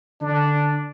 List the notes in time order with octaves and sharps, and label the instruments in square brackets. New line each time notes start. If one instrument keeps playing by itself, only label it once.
[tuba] D3 [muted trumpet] D4